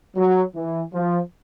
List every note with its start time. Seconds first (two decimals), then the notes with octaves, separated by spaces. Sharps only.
0.16 F#3
0.55 E3
0.93 F3